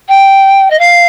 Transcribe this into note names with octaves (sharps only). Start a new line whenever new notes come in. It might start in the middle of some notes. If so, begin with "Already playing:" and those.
G5
D#5
F5